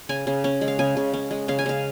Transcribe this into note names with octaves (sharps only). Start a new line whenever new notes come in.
C#3 G#5
C#3
C#4
G#3
F5
C#3 G#5
C#3
C#4
G#3
C#3 F5
G#5
C#3 F5